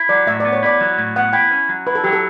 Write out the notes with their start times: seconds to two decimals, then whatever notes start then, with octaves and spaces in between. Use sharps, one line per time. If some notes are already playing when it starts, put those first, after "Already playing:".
Already playing: E4
0.09 F#3 D5
0.27 A2 E5
0.40 B3 D5
0.53 C#5
0.63 E4 D5
0.81 F#3
0.98 A2
1.16 B3 F#5
1.33 E4 G5
1.51 C#4
1.69 F#3
1.87 E4 B4
1.95 A4
2.04 F#3 G4
2.13 A4